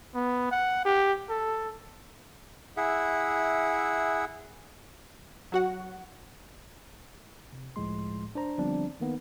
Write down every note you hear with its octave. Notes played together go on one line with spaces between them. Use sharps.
B3
F#5
G4
A4
E4 G#4 E5 F#5
F#3 F#4 F#5
C3
C#2 A2 F3 G#3 C6
D4 C5 A#5
D3 F3 G3 B3 C4 D4
D#3 A#3 B3 D#4